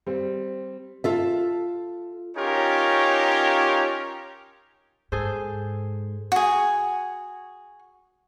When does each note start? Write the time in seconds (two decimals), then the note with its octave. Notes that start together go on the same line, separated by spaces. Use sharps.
0.07 G3 C4
1.04 F4 A4 E5
2.36 C#4 D#4 F4 G4 A#4 C#5
5.12 G#2 G#4 A4 C5
6.32 F#4 G#4